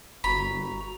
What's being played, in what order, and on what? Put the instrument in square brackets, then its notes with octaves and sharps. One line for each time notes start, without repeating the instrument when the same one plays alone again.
[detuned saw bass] G1 [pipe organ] F#4 A#5 [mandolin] B5